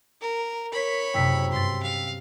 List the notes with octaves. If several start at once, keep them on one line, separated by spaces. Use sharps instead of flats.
A#4
A#4 C#5 B5 B6
F#1 F#2 C3 G5 E6 B6
G2 C6 A6
F5